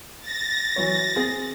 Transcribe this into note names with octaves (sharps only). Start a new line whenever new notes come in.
A6 A#6
E3 F#3 C#5
C4 G#4